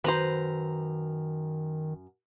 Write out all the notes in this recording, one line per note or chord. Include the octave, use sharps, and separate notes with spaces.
F#2 D#3 B4 C5 A#5